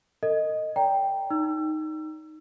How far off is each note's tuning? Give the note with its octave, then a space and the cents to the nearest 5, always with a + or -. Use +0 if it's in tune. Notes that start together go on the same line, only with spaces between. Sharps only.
A4 +45 D#5 +0
D5 -35 G5 +0 A#5 +0
D#4 +0 E6 +30